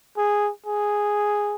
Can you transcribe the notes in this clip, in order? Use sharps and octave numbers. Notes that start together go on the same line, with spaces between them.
G#4
G#4